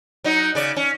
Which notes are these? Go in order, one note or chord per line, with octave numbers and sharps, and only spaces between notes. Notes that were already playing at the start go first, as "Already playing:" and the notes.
F#3 D#4
C#3 D5
C#4